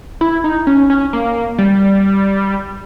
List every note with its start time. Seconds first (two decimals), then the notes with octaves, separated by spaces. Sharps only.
0.21 E4
0.44 D#4
0.67 C#4
0.90 C#4
1.13 A#3
1.58 G3